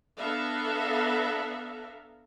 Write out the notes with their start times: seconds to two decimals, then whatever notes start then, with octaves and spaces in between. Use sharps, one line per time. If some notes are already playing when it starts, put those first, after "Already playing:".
0.18 B3 D4 A4 E5 F5 A#5